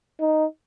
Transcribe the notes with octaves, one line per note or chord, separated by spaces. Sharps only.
D#4